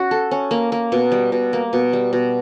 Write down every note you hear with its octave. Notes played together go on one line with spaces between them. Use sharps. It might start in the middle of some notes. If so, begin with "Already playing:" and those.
Already playing: C#4 F#4
A4
C#4
A#3
A#3
B2
G3
B2
A#3
B2
G3
B2